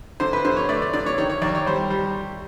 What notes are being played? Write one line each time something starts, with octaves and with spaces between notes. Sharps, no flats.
D3 C5
B4
D3 C5
C#5
A3 D5
D5
D3 D5
C#5
D#3 C#5
C#5
D#2 D5
C#5
G3 C5
G3